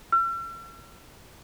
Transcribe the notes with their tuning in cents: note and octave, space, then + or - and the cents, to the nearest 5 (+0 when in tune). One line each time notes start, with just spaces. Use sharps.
E6 +45